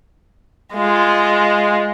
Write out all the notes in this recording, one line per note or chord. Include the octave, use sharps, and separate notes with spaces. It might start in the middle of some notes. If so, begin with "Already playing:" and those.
G#3 F4